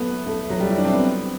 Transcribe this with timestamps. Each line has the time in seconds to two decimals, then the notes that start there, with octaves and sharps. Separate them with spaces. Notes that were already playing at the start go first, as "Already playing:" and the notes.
Already playing: F#3 A3 B3
0.26 A3
0.50 F#3
0.60 G3
0.70 E4
0.78 D4
0.85 C4
0.93 B3